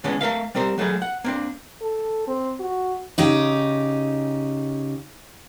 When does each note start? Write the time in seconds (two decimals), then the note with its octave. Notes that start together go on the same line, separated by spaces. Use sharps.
0.04 A2 D3 G#3 B3 C#4
0.21 A3 A#4 E5 F5
0.55 G3 C4 A#4 C5
0.78 F#3 A3 A#3 G#4 B5
1.02 F#5
1.24 A#3 C4 D4
1.82 A4
2.28 C4
2.60 F#4
3.18 C#3 D#4 G4